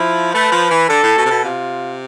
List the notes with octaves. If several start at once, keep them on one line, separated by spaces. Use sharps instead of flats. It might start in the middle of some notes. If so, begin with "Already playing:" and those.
Already playing: F3 E4
A3 B4
F3
E3
D3 A4
A2
B2
C3
B2
C3 F4